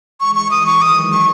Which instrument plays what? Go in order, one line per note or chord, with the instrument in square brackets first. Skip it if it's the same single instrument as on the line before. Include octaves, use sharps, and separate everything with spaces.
[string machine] E3 G#3 [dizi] C#6
[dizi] C#6
D#6
C#6
[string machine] D#3 F#3 [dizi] D#6
[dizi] C#6